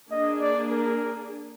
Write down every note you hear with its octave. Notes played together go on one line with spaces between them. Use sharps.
A#3 D4 G#4 D#5
D5
A#4